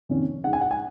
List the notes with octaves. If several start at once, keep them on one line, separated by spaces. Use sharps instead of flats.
F2 C3 D#3 A#3 C#4
C#3 G#3 D#4 F#5
G#5
F#5
G#5